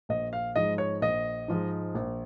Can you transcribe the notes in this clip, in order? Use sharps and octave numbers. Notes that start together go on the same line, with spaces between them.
A#1 D#5
F5
G#2 F3 G#3 D#5
C#5
A#1 D#5
G#2 F3 G#3
A#1